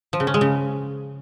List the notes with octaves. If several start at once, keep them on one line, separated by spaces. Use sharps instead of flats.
F3
C#3
C#4
G#3
C#3